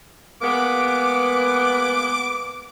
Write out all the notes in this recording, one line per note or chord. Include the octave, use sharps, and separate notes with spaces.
G#3 A#3 B3 D6